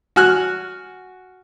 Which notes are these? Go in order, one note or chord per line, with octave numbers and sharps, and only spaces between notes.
F#4 G#5 F6 F#6